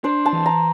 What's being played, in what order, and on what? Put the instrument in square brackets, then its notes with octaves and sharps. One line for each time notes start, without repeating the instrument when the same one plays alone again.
[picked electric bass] D4 [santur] C5
[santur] A5
[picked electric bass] E3
[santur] A#5